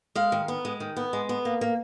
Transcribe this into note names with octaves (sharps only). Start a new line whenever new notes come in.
G#3 F5
D#3
B3
G#3
D#3
B3
G#3
B3
A#3
A#3